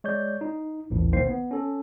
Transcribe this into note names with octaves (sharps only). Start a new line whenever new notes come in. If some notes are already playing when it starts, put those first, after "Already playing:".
G#3 C#5 D5 G6
D#4
A1 D#2 A2
B1 D#3 A#3 C5 C7
B3
C#4 A4